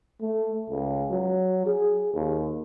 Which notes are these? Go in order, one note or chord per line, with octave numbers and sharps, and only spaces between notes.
A3
C#2
F#3
G#4
D#2